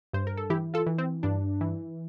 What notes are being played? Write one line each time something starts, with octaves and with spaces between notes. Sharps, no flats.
G2 C5
A#4
A4
E3 E4 G4
F4 A4
E3
C4
G2 D4
E3